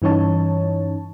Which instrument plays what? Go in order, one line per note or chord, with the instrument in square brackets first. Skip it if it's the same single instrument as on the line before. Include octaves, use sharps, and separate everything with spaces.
[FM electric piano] G2 E3 C#4 D#4 C#5 A5